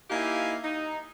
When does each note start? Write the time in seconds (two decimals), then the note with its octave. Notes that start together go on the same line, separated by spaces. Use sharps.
0.10 A#3 D#4 E4 G4 F5 G#5
0.63 D#4